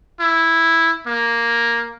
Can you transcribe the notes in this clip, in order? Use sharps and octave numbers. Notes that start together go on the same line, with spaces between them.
E4
A#3